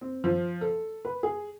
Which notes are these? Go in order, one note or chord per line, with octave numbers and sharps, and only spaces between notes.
C4
F3
A4
B4
G#4